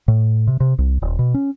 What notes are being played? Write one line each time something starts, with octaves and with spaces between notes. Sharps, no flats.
A2
C3
C3
C2
D#1
B2
C#4